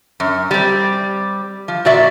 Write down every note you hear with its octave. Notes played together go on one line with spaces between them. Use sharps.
F#2
G3 C4
F3
A#2 F#4 D5 E5